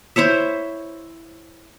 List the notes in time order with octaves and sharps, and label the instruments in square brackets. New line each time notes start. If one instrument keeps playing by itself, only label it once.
[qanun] E4 C5 C#5 E5